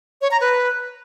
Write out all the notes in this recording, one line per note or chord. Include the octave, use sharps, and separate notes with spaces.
C#5
A#5
B4